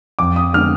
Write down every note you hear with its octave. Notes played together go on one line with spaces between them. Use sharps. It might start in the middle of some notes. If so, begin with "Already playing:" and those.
F2 D6
D#6
D3 G#3 B3 F6